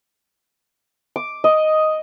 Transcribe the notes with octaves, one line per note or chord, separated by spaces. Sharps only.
D6
D#5